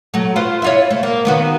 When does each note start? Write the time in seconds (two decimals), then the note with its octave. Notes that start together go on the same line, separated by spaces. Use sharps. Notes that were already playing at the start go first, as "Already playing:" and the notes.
0.14 F#3 A3
0.36 F4 B4 C5
0.62 E4 F4 C#5
0.90 A3
1.03 A#3
1.25 D#3 B3 F#4